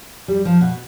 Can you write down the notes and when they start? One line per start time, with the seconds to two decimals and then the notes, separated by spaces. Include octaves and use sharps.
0.28 G3
0.45 F3
0.61 B2